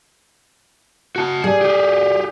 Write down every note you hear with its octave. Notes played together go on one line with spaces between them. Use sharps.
F#4 A5
G3 G#4
G4 G#4